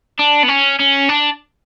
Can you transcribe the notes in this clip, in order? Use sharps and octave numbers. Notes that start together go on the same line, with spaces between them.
D4
B3
C#4
C#4
D4